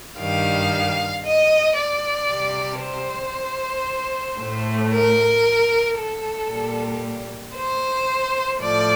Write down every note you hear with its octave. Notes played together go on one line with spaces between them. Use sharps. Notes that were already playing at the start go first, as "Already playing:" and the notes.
G2 D#3 G3 F5
D#5
D5
C3 G3
C5
A2 A3
A#4
A4
A#2 G3
C5
A2 F3 A3 D5